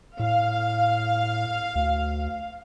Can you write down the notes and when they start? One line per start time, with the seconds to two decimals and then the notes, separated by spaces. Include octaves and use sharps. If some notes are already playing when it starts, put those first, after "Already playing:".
0.19 A2 F5
1.75 D2